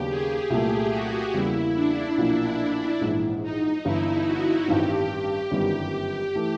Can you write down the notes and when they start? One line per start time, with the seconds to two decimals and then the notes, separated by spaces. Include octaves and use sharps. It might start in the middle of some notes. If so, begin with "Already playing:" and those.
Already playing: D#2 C#3 F#3 B3 D4 G4
0.09 G#4
0.50 C2 A#2 F#3 A3
0.93 F#4
1.34 E2 C#3 E3 G3 A#3 E4
1.75 D4
2.18 B1 A#2 F3 A#3
3.01 A#1 G#2 E3
3.43 D#4
3.85 G1 G2 E3 E4
4.26 F#4
4.68 A1 G2 D#3 G3 C4 G4
5.10 G4
5.51 G1 F#2 D#3 G3 B3
6.35 E3 A3